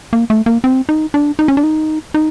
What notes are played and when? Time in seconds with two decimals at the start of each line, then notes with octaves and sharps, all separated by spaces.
0.13 A#3
0.30 A3
0.46 A#3
0.64 C4
0.89 D#4
1.14 D4
1.39 D#4
1.48 C#4
1.57 D4
1.63 D#4
2.14 D#4